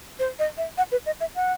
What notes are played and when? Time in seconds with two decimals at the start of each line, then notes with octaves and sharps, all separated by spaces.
0.19 C5
0.39 D#5
0.58 E5
0.78 F#5
0.92 B4
1.06 D#5
1.21 E5
1.35 F#5